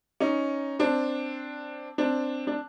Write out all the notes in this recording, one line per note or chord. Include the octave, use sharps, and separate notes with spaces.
C#4 D#4
C4 D4
C4 D4
D4